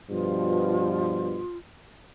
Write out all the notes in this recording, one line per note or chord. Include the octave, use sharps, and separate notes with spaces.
G2 B2 F3 F4